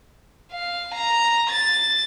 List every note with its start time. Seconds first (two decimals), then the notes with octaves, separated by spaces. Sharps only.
0.53 F5
0.94 A#5
1.50 A6